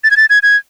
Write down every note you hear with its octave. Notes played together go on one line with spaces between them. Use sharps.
A6
G#6
A6
G#6
G#6